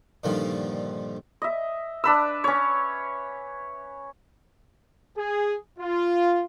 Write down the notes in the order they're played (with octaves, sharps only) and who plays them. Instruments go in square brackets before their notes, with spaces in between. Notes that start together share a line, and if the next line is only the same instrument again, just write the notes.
[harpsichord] G2 A#2 D3 D#3 F3
[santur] D#5 E5
D4 B4 E6
C#4 C#5
[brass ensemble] G#4
F4